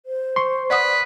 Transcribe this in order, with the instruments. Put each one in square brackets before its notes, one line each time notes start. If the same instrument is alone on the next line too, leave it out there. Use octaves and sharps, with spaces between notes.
[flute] C5
[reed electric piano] C6 C#6
[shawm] B4 [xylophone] D5 F#5 D#6